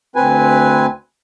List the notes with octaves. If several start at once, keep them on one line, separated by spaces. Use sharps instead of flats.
D2 C4 B4 G#5